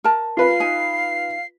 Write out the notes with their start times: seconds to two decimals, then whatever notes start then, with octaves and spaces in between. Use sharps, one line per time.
0.04 A#4 A5
0.37 F4 B4 F5 C7
0.60 D#4 G#5